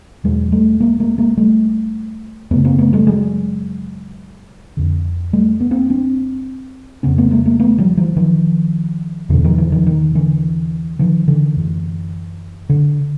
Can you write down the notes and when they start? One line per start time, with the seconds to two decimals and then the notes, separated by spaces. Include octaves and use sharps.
0.24 E2 B2 F#3 G#3
0.52 G3 A3
0.80 G#3 A#3
1.00 G#3 A#3
1.18 G#3 A#3
1.37 G3 A3
2.51 F#2 C#3 A3 B3
2.65 A#3 C4
2.78 A3 B3
2.93 G3 A3
3.07 F#3 G#3
4.77 F2 D3
5.33 G3 A3
5.61 B3
5.71 A#3 C4
5.90 C4 D4
7.03 F2 C#3 B3 C#4
7.18 A3 B3
7.31 G#3 A#3
7.46 G#3 A#3
7.60 A3 B3
7.78 F3 G3
7.97 E3 F#3
8.16 D#3 F3
9.29 E2 B2 D3 E3
9.44 D#3 F3
9.57 E3 F#3
9.72 D#3 F3
9.87 D#3
10.15 D3 E3
10.99 D#3 F3
11.28 D3 E3
11.57 F#2 D3
12.69 D3